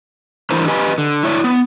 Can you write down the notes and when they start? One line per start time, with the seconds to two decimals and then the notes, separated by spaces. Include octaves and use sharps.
0.50 E3 D4 E4 A#4 C5 A#5
0.68 G4 B4 D#5 G#5
0.98 D3
1.23 E4 C#5 D5
1.44 B3